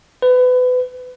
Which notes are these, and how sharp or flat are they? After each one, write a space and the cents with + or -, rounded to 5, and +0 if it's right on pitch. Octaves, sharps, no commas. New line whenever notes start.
B4 +30